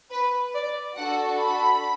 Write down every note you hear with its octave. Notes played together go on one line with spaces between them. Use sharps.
B4
D5
D4 F#4 A4 F#5
B5